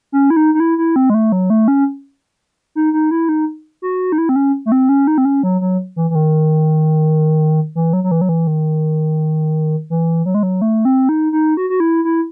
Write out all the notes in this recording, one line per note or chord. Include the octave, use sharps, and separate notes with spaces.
C#4
E4
D#4
D#4
E4
E4
C4
G#3
A3
F#3
A3
C#4
D#4
D#4
E4
D#4
F#4
D#4
E4
C4
C#4
A3
C4
C#4
D#4
C4
C#4
F#3
F#3
E3
E3
D#3
E3
F#3
F#3
E3
F#3
E3
D#3
E3
F#3
G#3
F#3
A3
C4
D#4
D#4
F#4
F#4
E4
E4